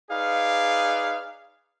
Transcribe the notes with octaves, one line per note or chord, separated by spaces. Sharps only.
D#4 G#4 B4 D5 F5